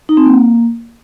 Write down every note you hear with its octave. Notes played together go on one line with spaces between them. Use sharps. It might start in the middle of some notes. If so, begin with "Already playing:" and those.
D#4
C4
A#3